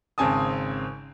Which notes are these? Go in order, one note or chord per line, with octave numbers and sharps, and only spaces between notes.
G#1 C#3 C4 G#5 A5 D#6